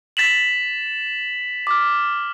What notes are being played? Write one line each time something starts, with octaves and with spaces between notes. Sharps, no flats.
A6 B6 E7 F#7
D6 F6